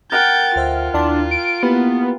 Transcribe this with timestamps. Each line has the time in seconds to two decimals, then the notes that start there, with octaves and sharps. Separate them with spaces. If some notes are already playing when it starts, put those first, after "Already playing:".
0.12 A#4 F#5 G5 G6 A6
0.56 D2 F4 C5 E5
0.94 D#2 D4 E4 C6
1.31 D7
1.63 A#3 B3 E4 G4